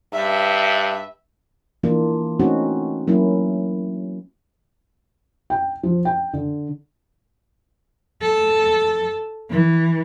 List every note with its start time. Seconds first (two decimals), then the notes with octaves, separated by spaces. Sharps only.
0.13 G2 E5
1.83 E3 A#3 D4 F4
2.39 A3 C4 C#4 D#4 F#4
3.07 F#3 A#3 C#4 E4
5.50 G5
5.83 F3
6.05 G5
6.33 D3
8.22 A4
9.51 E3